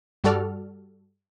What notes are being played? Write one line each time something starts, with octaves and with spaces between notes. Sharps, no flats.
G2 G3 F#4 A4 D5 F6